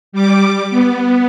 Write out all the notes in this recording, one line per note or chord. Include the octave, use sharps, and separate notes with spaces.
G3 D6
B3